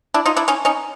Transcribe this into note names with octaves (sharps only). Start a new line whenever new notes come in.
D4 E4
D#4 F4
D4 E4
C#4 D#4
C#4 D#4